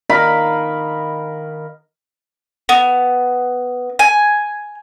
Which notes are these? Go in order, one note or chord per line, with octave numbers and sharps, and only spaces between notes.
D#3 A#4 F5 B5
B3
G#5